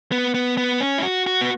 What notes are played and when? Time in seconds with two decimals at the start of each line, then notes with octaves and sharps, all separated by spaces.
0.12 B3
0.34 B3
0.57 B3
0.80 C#4
0.98 E4
1.03 F#4
1.27 F#4
1.41 B3